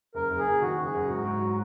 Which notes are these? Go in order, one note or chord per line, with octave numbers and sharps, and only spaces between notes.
F#1 A#4
F#1
G#4
F#1
D#3 F#4
F#1
G#4
F#1
G#2 F#4
G#2
F#3